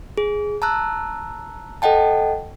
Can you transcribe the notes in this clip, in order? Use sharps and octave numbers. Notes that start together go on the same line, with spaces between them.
G#4
A5 A#5 E6 F#6
A4 D#5 F#5 G5 A5